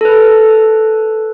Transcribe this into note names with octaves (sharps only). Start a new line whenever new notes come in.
A4 B4